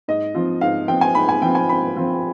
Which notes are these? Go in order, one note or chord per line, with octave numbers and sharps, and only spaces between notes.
G#2 D#5
F3 C4 F4
G#2 F5
F3 C4 F4 G5
G#5
G#2 B5
G#5
F3 C4 F4 G5
G#5
G#2 B5
F3 C4 F4